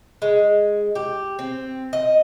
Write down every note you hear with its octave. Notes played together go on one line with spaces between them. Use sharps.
G#3
G4
C4
D#5